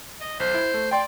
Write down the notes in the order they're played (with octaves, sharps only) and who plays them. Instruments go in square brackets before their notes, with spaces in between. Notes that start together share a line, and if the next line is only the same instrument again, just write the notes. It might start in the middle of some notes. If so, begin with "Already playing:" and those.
[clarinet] D#5
[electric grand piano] B1 [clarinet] C5
[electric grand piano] E4
A3
[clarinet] D5 [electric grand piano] G5 C6